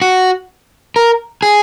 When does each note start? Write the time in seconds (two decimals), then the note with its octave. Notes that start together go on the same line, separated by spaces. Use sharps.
0.02 F#4
0.96 A#4
1.43 G#4